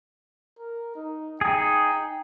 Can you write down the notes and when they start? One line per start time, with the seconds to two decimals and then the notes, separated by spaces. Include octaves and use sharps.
0.59 A#4
0.96 D#4
1.41 D#4 G#4 G5